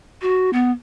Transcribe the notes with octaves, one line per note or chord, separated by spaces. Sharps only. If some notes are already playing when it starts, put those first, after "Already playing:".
F#4
B3